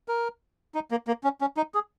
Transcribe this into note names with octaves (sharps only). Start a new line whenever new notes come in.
A#4
D#4
A#3
A#3
C#4
C#4
D#4
G#4